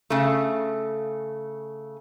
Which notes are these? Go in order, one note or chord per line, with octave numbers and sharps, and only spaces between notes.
C#3 A3